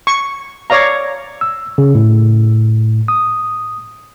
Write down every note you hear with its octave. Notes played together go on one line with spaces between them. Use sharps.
C#6
C#5 D5 F5 A#5
E6
C#3
A2
D#6